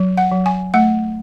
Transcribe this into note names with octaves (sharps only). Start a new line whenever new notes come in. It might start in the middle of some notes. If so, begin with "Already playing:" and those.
Already playing: F#3
F#5
F#3
G#5
A3 F#5